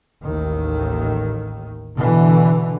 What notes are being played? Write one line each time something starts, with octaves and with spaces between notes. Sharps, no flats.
A1 D#2 D#3
B2 D3 E3